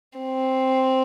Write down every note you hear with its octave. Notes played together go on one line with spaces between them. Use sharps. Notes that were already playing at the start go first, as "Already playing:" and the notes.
C4